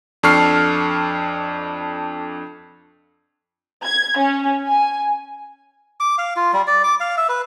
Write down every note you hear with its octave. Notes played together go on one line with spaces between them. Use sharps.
F2 D4 A4 C#6 F6 C7
G#6
C#4
G#5
D6
F5
F4
G3
D5
D6
F5
E5
B4